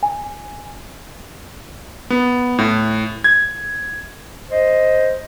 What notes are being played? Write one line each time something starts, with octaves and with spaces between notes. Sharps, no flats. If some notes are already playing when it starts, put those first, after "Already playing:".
G#5
B3
A2
G#6
C5 D#5